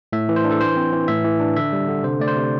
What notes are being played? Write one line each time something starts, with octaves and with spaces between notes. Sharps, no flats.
A2 E5
E3
C5
D4
A4
E3 C5
C4
E3
A2 E5
E3
D4
D3 E5
G3
D3
C3 C5
A3 D5
C5
C3